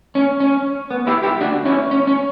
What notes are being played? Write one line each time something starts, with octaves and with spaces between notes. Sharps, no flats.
C#4
C#4
B3
E4 G4
E4 G4
D4 F#4
C#4 E4
C#4
C#4